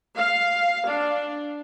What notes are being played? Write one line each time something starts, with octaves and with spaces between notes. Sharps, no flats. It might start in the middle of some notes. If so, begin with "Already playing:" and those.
F5
D4